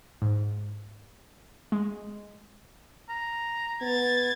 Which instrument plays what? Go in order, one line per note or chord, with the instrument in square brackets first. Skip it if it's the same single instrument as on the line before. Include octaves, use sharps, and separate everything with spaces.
[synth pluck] G#2
G#3
[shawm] A#5
[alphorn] B3 [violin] G#6 A6